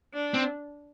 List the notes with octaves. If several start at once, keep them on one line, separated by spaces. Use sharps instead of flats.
D4
C4